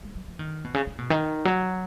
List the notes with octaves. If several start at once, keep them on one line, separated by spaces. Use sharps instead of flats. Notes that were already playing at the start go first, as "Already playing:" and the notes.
G#3
F#3
F3
D#3
B2
C#3
C#3
B2
D#3
F#3